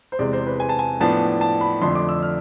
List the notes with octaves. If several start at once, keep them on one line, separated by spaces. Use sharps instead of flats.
C5
E2 C3 G#3 D5
C5
B4
G#5
A5
G#5
A2 F3 B3 D4 A5
A5
B5
F2 D3 F3 A3 D4 C6
D6
E6
F6